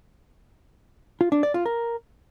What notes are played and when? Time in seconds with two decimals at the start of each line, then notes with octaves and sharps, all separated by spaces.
1.21 F4
1.32 D4
1.43 D5
1.54 F4
1.66 A#4